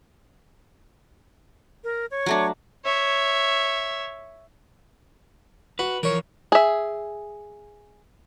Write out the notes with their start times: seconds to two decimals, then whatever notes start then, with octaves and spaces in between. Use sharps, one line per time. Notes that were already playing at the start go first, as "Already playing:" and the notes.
1.84 A#4
2.11 C#5
2.26 F#3 A3 D4
2.85 C#5 E5
5.79 F#4 B4
6.03 E3 F3 A#4 C#5
6.52 G#4 E5